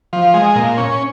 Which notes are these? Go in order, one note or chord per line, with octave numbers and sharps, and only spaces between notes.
F3
G#3
A#2
C#4